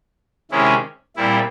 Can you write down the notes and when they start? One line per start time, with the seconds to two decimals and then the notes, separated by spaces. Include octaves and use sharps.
0.51 C3 D#3 G#3 C#4 E4
1.16 A#2 G3 C4 E4